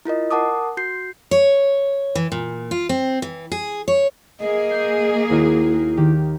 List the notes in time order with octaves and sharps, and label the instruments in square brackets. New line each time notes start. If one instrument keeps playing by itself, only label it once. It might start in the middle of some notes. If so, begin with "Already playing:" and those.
[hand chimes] E4 F4 A#4 D#5
A#4 F#5 A5 D6 D#6
F#4 G6 C7
[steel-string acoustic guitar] C#5
E3
A#2
F4
C4
E3
G#4
C#5
[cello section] A#3 G#4 [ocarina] D#5
[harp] G6 C7
[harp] D#2 F#4 D#5 [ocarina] E4
[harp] D#3 G4